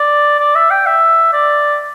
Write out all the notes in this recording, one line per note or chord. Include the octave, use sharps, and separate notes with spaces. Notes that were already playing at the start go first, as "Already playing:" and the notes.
Already playing: D5
D5
E5
G5
E5
D5